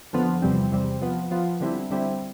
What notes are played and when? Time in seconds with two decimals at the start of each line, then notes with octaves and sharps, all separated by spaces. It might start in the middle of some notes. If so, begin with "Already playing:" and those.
0.13 F2 D3 F3 B3
0.42 E2 C3 G3 C4
0.72 E2 C3 G3 C4
1.02 F3 B3 F4
1.31 F3 B3 F4
1.61 D3 G3 C4 E4
1.90 D3 G3 C4 E4